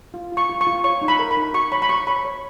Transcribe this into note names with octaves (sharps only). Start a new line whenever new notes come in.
F4
F4 C#6
F4
C#6
F4
C#5 C#6
D#4
B5
A#4
B5
D#4
F#4 C#6
C#5 B5
B5
F#4 C#6
C#5 B5
C#5